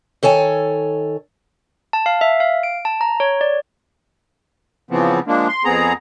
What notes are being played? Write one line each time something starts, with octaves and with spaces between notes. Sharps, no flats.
D#3 A4 C#5 G#5
A5
F5
E5
F5
D7
A5
A#5
C#5
D5
C#3 E3 F3 B3 C4
F3 G#3 A#3 D4
C6
F2 B3 C4 G#4 A#5